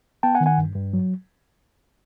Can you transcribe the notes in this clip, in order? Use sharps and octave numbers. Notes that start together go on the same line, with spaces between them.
B3 G5 A5
F#5 G#5
D#3
F#5 G#5
G2
G2
F#3